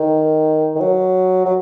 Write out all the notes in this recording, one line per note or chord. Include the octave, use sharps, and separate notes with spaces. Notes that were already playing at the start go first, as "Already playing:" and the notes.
Already playing: D#3
D#3
F#3
F#3